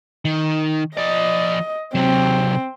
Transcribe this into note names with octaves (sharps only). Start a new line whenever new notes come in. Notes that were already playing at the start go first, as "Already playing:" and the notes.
D#3
F3 D5 D#5
C3 F#3 C4